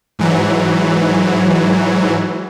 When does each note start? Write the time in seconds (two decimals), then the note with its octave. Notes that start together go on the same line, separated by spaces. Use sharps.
0.19 G#2 E3 F#3